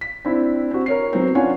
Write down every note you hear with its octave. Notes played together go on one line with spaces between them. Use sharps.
B6
C4 D4 E4
C4 F#4
A#4 C#5 C7
F#3 B3 C4
C#4 D4 F4 C#5 F#5 G#5